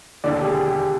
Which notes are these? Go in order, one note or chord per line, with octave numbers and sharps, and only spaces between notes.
E1 D#2 D3 D5
G4
G#4
G4